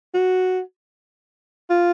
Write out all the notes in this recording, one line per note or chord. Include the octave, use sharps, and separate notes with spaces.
F#4
F4